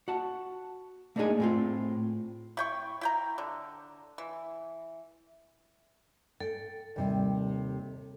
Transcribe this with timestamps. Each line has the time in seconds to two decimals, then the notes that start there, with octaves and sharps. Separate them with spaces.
0.08 F#4 F#5 A5
1.16 A3 A#3 D4 D#4 G#4 G#5
1.40 A2 C4 F4
2.57 E4 G5 C#6
3.01 E4 G5 A#5
3.38 D3
4.18 E3
6.40 A4 G5
6.96 D#2 C3 G3